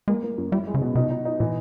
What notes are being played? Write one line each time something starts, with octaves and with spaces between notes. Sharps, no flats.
G#3 A#3
A#3
F#2
G3 E4
G#3
C#3
B2
C3 D#4
D#4
D#4
A#2 E3